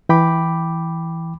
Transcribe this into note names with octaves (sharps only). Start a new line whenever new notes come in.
E3 G5 B5 D6